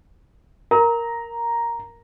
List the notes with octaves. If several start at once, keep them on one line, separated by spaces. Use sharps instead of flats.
A#4 A#5